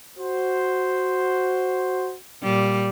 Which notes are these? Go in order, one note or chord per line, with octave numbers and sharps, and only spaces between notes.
F#4 C5
A#2 G3